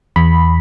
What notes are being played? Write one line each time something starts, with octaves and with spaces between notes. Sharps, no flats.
E2 B5